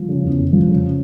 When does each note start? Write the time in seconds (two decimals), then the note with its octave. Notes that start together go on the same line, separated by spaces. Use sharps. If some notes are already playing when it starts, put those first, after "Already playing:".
Already playing: F3
0.08 C#3
0.23 E2
0.38 F1
0.53 F3
0.68 C#3